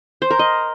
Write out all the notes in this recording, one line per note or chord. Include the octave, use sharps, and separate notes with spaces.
C5
A#4
D#5